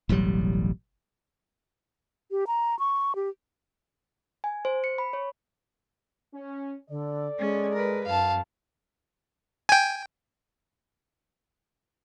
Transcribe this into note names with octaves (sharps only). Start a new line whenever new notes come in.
E1 A1 F#3 G3
G4
A#5
C#6
G4
G#5
C5
C#7
B5
C#5
C#4
D3 A4 D5
G#3 C#4
A#4 B4
F#2 F5 A5
G5 G#5